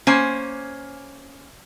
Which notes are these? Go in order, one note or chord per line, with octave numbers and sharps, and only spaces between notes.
A#3 C#4 C5 G#5